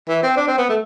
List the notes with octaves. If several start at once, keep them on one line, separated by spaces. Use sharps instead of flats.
E3
C4
D4
C4
B3
A3